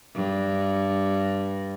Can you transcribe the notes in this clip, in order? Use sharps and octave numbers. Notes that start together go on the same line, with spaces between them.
G2